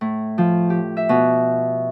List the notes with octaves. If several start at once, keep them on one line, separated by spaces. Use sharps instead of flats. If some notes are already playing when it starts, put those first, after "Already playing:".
A2
F3
G4
E5
B2